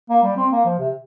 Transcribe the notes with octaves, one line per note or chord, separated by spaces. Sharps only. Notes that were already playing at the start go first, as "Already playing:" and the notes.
A#3
G3
C4
A#3
F3
C3